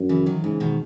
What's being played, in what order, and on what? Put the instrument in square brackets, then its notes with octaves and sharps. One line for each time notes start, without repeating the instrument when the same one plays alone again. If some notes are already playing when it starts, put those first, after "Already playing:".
Already playing: [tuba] F#2
[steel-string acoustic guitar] C#3 E3
D#3 F#3
[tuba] G#2 [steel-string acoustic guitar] C#3 E3
[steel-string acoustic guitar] B2 D#3